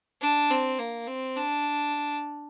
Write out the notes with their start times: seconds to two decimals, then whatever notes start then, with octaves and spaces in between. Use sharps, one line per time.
0.21 D4
0.50 C4
0.79 A#3
1.07 C4
1.37 D4